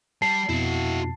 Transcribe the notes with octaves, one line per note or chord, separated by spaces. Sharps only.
G3 A5 C7
F2 B2 E4 F#4